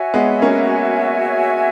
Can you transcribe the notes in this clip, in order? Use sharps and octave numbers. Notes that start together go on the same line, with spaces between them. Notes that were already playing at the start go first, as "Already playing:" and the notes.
Already playing: F#4 C#5 E5 G#5
G#3 B3
A#3 C#4